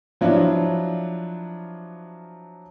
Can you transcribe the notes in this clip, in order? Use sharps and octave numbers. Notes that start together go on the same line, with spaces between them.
F3 F#3 D4 E4 F4